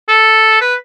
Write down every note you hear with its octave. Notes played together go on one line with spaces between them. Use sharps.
A4
B4